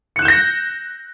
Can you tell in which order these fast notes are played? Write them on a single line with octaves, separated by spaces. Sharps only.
C#7 F#6 E7 G6 A#6